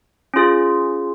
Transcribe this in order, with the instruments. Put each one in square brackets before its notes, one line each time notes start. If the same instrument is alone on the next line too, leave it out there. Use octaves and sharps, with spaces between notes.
[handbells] C#4 F4 G#4